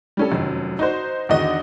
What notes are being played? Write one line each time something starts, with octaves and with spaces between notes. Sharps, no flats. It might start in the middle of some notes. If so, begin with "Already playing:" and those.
G3 C#4 A4
F1 F#2 D#3
D#4 F#4 C5
E2 D3 D#3 F#4 D#5